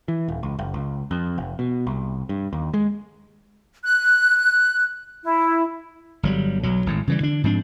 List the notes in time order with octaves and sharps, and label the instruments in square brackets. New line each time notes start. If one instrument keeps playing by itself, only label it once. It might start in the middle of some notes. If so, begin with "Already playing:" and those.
[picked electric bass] E3
D#1
C#2
F#1
C#2
F2
F1
B2
C2
G2
D#2
G#3
[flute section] F#6
E4
[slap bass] G1 F#3 G3
B1 F#3
G#1 A2
C#3 E3 G3
D3 D4
G#2 F3 C4 D4